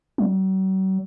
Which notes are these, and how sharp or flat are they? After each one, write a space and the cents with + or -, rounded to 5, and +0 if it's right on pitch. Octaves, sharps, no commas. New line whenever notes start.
F#3 +45